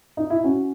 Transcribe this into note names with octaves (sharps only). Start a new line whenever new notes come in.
D#4
E4
C#4 F#4